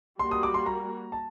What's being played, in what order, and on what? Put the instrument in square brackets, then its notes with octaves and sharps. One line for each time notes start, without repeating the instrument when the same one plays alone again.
[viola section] G3 A#3 F#4 [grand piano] C6
[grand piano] D#6
D6
C6
A#5
A5